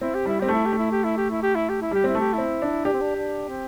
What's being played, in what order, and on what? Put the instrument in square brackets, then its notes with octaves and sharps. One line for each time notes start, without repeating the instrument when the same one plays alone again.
[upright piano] C4 [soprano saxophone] E4
[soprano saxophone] G4
[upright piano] G3 [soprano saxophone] E4
[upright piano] C4 [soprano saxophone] G4
[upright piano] A3 [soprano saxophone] E4
[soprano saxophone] G4
[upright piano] A3
[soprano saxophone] E4
G4
E4
G4
E4
G4
E4
G4
E4
[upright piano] G3 [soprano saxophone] G4
[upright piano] C4 [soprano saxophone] E4
[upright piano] A3
[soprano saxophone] G4
[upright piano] C4 [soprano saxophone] E4
[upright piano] D4
[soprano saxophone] D4 [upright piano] G4
[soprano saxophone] C4
D4
D4
C4